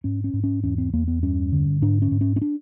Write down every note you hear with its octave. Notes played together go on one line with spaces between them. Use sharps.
G#2 C#4
C#4
G#2
C#4
E2 C#4
C4
E2 A#3
B3
G2 C#4
D3
G#2 D4
C#4
G#2
C#4
C#4
D4